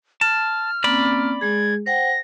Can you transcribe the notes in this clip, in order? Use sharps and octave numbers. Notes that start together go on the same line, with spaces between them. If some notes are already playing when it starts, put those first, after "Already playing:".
A5 F6
A#3 C4 C#4 D5 B5
G#3 G#4 G#6
C5 F#5 G5 A#6